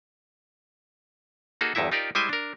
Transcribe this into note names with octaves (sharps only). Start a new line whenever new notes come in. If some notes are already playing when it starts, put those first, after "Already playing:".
A#3 D#4 F#4 G#4 A4
G1 E2 G2 D#4 E4 E5
D#4 F4 G4 A#4 D5
G3 G#3 E4 C5 G5 G#5
D4 A#4